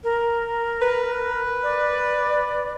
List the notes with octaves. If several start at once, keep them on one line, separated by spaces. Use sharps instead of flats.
A#4
B4
D5